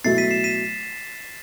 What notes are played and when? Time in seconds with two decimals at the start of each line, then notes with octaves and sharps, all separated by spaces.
0.04 B2 F#3 A3 E4 A6 C7
0.18 B6 D#7
0.31 C7 E7
0.44 B6 D#7